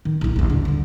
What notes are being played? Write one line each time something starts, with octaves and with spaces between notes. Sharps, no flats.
D#3
A#1 E4
A#1 D#2
D3
D3 G3